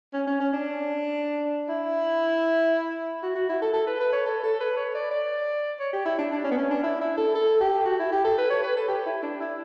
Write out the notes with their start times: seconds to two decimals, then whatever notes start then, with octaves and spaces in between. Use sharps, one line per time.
0.13 C#4
0.27 C#4
0.40 C#4
0.53 D4
1.69 E4
3.23 F#4
3.35 F#4
3.49 E4
3.62 A4
3.73 A4
3.87 B4
4.00 B4
4.12 C#5
4.25 A4
4.43 A4
4.60 B4
4.76 C#5
4.95 D5
5.11 D5
5.80 C#5
5.93 G4
6.05 E4
6.18 D4
6.32 D4
6.44 C#4
6.51 B3
6.58 C#4
6.70 D4
6.83 E4
7.01 E4
7.17 A4
7.35 A4
7.61 G4
7.85 F#4
7.99 E4
8.12 G4
8.24 A4
8.38 B4
8.50 C#5
8.63 B4
8.76 A4
8.88 G4
9.06 E4
9.23 D4
9.40 E4